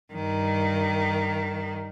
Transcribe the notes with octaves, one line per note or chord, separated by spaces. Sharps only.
G2 D#3